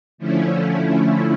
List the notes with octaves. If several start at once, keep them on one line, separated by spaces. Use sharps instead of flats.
D3 F3 A3 C#4 E4